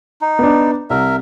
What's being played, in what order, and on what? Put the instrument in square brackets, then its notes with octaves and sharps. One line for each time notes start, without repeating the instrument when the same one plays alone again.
[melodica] D#4
[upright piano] B3 D4
[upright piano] C2 [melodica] A#4 E5